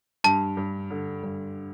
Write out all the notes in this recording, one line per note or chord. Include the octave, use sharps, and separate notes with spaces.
G2 A5
G2
D3
G2